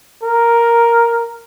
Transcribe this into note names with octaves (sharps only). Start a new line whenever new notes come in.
A#4